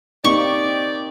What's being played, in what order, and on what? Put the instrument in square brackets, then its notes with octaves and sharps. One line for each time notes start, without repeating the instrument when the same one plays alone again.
[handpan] A#3 C4 D#4 [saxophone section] G4 D5 [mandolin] C#6